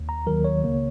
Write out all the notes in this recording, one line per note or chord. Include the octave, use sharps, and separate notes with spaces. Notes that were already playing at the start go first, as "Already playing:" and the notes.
Already playing: D#2
A#5
D#2 D#3 F#3 A#4
C#5
C#2 C#3 A#3